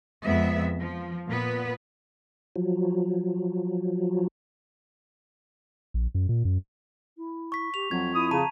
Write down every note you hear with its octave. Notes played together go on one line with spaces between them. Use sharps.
F2 G#3 B3 E5
F3
A#2 B3 B4
F3 F#3
A#1
F#2
A#2
F#2
E4
C#6 B6
G4 F7
F2 F#3 G#6
E4 D#6
C#3 A5 A#5 D#7